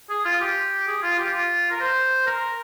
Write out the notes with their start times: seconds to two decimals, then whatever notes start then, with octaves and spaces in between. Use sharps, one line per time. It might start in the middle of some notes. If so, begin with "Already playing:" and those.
0.10 G#4
0.25 F4
0.41 G4
0.87 G#4
1.03 F4
1.18 G4
1.33 F4
1.71 A#4
1.80 C5
2.27 A#4